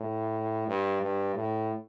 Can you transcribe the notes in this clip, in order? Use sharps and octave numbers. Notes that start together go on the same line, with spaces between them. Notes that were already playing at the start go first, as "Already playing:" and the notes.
Already playing: A2
G2
G2
A2